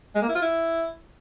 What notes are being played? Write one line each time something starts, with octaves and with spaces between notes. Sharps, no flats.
G#3
A#3
E4
F4
E4